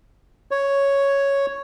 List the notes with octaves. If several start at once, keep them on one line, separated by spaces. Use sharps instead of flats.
C#5